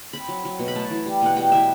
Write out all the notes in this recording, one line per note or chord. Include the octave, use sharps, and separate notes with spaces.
C4 B5
F#3
F#3
B2
B5
A3 A5
E3
G3
B2 F#5
G3 G5
E3 E5